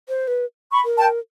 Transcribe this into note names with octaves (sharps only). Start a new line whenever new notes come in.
C5
B4
B5 C#6
A#4
G5 A5